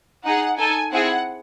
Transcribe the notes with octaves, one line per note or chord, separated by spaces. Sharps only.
D#4 G#4 F#5
D#4 A4 G#5
C4 E4 G#4 F#5